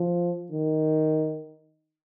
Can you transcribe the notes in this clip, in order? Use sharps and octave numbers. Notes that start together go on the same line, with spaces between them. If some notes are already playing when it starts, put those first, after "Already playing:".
Already playing: F3
D#3